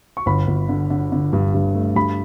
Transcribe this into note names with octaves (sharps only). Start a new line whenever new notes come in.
C#6
G1 B5
G1
D3
D3
D3
G2
G2
A3
G2 B5